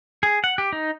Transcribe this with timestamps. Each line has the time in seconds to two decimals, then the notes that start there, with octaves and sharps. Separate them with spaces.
0.23 G#4
0.44 F#5
0.58 G4
0.73 D#4